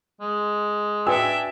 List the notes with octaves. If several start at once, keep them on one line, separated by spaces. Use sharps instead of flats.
G#3
D4 F#4 B4 E5 G5 G#5 E6